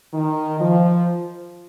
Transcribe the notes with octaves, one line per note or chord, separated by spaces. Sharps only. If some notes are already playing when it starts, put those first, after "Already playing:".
D#3
F3